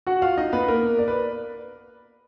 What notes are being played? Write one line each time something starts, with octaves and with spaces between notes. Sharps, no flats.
F#4 F#5
F4 F5
D#4 D#5
B3 B4
A#3 A#4
D5
B4